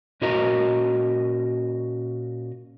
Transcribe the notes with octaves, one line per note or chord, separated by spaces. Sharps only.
A#2 C#4 F#4 A#4 D#5 A#5